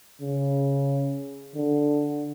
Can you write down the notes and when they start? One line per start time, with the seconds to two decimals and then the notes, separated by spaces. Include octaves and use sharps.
0.21 C#3
1.56 D3